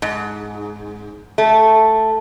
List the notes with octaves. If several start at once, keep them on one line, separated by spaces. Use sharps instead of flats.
G#2
A3